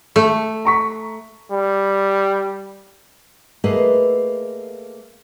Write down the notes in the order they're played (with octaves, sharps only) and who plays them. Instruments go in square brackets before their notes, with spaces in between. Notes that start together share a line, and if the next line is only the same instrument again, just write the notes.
[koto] A3
[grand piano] A#5 C#6 B6
[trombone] G3
[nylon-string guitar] A3 A#3 G#4 B4 D#5